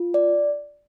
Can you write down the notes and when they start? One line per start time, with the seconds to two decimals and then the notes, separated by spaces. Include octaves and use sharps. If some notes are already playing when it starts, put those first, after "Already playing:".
Already playing: F4
0.14 D5